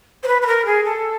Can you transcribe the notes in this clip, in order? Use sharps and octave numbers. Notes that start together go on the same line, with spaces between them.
C5
B4
B4
A#4
G#4
A4